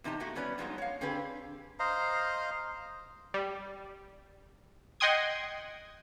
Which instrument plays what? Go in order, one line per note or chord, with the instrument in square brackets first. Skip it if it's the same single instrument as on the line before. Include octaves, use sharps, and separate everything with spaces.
[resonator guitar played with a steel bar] E2 C3 D#4 G4 A5
A3 A#3 F#4 G4
G3 B3 C#4 B4 D5
G2 F3 F#3 G#3 B3 D#4
C#5 F5
D3 C4 D4 G4 G#4 B4
[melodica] C5 D#5 F5 A#5
[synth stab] G3
D#5 F#5 G5 C6 D#6 G#6